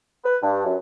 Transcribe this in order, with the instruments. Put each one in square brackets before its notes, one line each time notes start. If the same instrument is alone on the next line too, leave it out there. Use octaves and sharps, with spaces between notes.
[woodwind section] B4
G2
F#2